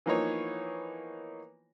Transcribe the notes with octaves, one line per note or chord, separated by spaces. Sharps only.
E3 F3 A#3 B3 D#4 C#5